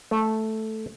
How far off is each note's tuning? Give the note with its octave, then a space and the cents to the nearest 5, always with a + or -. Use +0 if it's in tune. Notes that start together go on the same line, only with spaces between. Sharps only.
A3 -5